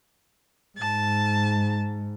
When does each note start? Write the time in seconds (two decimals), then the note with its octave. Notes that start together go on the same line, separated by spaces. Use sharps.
0.78 G#2 A5